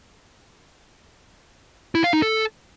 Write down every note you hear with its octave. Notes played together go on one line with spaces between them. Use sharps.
E4
F5
D#4
A4